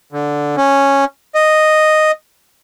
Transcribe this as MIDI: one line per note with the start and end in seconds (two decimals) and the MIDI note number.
0.12 0.56 50
0.57 1.05 61
1.35 2.11 75